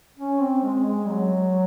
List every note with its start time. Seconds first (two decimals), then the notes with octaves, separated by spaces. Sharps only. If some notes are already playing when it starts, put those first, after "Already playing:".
0.19 C#4
0.41 C4
0.63 G#3
0.86 G#3
1.08 F#3